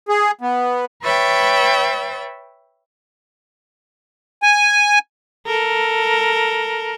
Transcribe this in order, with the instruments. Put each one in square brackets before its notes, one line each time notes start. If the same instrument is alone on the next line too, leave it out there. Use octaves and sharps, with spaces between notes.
[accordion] G#4
B3
[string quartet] B4 C#5 E5 G5 A6
[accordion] G#5
[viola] A4 A#4